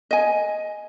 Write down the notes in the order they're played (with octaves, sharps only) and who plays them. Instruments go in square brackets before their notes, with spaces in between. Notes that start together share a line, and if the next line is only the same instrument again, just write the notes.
[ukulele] D#5 G#5